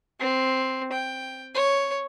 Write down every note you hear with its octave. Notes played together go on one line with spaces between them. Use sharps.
C4
G5
C#5